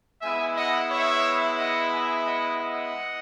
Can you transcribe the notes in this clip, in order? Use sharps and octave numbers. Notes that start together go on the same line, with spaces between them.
G#3 B3 E4 E5 G#5
D#5 F#5
C#5 E5
D#5 F#5
E5 G#5
D#5 F#5
D#5 F#5